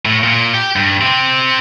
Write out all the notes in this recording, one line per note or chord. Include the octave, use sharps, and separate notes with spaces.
A2
A#2
G4
G2
C4 G4